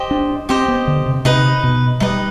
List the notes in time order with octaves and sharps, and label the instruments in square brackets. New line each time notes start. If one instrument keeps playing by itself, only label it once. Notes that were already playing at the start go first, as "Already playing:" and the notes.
Already playing: [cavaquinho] G4 C5 D#5
[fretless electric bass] D4
[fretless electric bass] C4 [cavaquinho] G4 C5 D#5
[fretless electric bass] B3
D3
C3
[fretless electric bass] C3 [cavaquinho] D#4 B4 D#5
[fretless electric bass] B2
[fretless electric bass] G3 [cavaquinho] D#4 B4 D#5